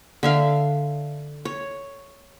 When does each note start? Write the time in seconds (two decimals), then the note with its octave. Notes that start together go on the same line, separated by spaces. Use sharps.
0.23 D3 E5 F5
1.45 C#5